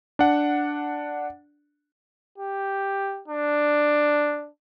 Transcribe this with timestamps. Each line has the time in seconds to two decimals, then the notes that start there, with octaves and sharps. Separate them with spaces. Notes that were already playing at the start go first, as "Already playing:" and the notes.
0.19 D4 F#5
2.38 G4
3.28 D4